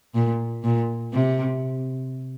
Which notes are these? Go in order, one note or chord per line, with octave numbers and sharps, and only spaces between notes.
A#2
A#2
C3